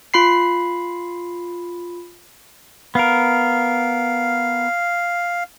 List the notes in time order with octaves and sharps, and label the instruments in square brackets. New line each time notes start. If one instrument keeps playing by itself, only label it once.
[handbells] F4 B5 C7
[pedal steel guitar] B3 A#4 [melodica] F5